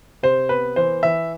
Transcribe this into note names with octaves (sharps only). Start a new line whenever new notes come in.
C3 C5
B3 B4
E3 C5
E3 E5